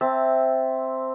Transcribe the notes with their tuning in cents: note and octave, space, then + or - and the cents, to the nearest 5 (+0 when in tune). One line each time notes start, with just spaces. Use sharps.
C4 +0 E5 +0 A5 +0